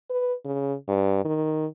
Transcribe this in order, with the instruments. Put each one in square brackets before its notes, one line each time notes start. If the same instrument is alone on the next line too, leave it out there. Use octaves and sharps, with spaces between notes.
[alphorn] B4
C#3
G2
D#3